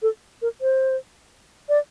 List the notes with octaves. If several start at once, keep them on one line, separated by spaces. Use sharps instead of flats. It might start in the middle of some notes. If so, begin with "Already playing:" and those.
A4
A#4
C5
D5